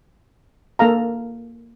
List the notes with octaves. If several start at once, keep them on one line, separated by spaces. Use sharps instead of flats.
A#3 A4 F5 A#5